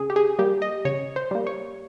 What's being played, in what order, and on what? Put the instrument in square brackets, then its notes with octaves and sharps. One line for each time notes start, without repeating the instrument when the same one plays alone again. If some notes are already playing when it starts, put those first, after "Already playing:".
Already playing: [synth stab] C#3 G#4
G4
G#4
G3 A#3 G4
D#5
C#3 C#5
C5
G3 A#3
C#5